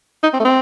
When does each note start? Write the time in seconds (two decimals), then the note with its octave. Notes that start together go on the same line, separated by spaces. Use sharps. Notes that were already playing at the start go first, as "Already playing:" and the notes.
0.23 D#4
0.33 C4
0.40 A3
0.45 C4